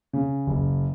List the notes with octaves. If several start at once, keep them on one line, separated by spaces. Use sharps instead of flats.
C#3
F#1